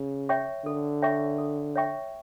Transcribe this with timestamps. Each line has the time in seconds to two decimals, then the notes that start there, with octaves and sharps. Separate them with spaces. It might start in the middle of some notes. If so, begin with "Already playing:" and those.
Already playing: C#3
0.29 C#5 E5 G5 C#6
0.65 D3 A4
1.02 C#5 E5 G5 C#6
1.38 A4
1.76 C#5 E5 G5 C#6